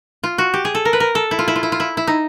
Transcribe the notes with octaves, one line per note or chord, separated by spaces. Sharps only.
F4
F#4
G4
G#4
A4
A#4
B4
A#4
A4
E4
F4
E4
F4
E4
F4
E4
E4
D#4